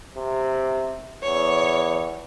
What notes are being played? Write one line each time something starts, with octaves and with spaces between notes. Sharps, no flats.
C3
E2 C#5